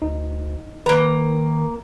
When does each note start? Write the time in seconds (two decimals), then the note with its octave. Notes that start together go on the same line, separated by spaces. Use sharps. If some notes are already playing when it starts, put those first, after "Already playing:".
0.02 D2 D#4
0.86 D#3 A#3 B4 A#5